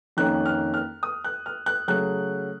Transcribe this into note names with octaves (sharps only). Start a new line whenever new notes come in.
F2 D#3 A#3 C#4 F#6
F6
F6
D#6
F#6
F6
F#6
C#3 F#3 A3 F#6